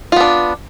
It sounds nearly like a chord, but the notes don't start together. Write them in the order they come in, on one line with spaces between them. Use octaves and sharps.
F4 B3 D4